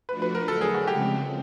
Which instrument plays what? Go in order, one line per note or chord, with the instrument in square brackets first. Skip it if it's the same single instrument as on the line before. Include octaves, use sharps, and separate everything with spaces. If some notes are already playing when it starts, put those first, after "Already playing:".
[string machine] F3 A3 D4 F#4 [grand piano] B4
[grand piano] B4
A#4
[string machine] D3 F#3 A3 [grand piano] A4
[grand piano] G#4
F#4
[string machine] C#3 F3 G#3 C4 [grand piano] G4